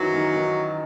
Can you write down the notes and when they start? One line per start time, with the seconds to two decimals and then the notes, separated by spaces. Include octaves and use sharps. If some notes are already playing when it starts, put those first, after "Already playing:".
Already playing: F#2 D#3 E3 F#3 F#4
0.14 D#3
0.36 D#3